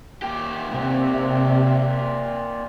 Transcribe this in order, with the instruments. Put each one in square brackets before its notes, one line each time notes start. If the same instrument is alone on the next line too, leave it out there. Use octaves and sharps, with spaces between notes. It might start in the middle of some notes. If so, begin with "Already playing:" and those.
[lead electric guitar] A#2 G4
[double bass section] C3